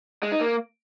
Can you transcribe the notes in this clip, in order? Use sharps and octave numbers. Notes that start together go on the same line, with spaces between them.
G#3
D#4
A#3